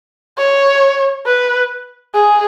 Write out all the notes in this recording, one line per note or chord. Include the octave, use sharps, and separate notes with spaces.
C#5
B4
G#4